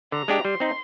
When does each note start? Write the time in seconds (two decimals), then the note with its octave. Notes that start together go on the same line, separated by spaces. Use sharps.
0.12 D3 A#5
0.28 G#3 D4 G4
0.44 G3 C6
0.60 C4 D#4